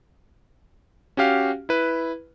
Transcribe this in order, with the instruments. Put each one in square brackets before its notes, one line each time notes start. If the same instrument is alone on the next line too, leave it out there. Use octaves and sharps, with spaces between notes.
[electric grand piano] C#4 F#4 G4 F5
E4 B4